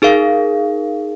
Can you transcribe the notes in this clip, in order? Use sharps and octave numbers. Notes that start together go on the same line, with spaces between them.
D#4 G#4 A#4 F5